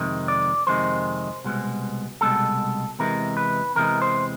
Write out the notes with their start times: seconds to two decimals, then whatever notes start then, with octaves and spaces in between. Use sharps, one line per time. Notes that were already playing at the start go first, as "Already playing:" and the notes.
Already playing: F2 C3 D#3 G#3
0.28 D5
0.67 F2 C3 D#3 G#3 C5
1.44 C2 B2 G#3
2.21 C2 B2 G#3 A4
2.99 E2 C3 E3 G#3 A#4
3.37 B4
3.75 E2 C3 E3 G#3 A#4
4.02 C5